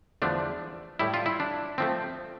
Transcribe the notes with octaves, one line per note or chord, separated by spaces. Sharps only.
E2 D3 F3 A3 D4
A2 G3 E4
F4
E4
D4
F3 A3 C4